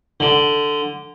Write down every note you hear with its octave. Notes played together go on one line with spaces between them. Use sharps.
D3